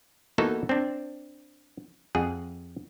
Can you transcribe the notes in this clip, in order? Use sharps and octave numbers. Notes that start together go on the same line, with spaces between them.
E3 A#3 B3 D#4 F#4 A4
C4 D4
F2 G#4 F#5